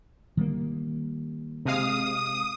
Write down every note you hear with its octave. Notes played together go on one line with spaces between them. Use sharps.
D#3 G3 A#3
C3 G#3 F5 D#6